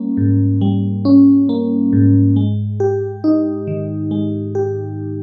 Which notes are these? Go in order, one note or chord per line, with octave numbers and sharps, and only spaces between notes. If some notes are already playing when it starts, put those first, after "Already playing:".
Already playing: G3 A#3 C#4
G#2
G3
C#4
A#3
G#2
G#3
G4
D#4
D#3
G#3
G4